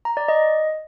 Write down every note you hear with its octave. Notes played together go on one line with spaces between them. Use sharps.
A#5
D5
D#5